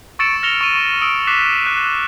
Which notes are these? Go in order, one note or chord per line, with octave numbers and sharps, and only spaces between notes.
C#6 E6 A6 C#7 D7 E7
F6 A#6 C#7 F7 G7
C#6 D#7
D#6 E6 D7
D6 F#6 B6 C7 E7
F#6